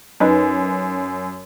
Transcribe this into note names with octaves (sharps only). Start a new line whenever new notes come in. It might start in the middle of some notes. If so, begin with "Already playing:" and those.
F#2 D#4 B4